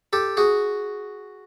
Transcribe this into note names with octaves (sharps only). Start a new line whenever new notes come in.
G4 A4
F#4 G#4